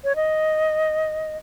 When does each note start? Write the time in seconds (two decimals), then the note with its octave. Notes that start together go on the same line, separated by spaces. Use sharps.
0.04 C#5
0.16 D#5